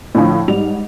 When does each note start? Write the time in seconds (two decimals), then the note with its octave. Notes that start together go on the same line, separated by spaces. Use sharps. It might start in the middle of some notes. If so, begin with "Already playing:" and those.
0.15 A2 D3 F3
0.48 G#2 G3 F7